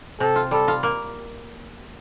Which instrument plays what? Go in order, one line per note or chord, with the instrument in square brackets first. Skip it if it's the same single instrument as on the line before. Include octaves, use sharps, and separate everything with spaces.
[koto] C3 [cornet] A4
[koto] F4
[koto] G3 [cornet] A4
[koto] F4
A#3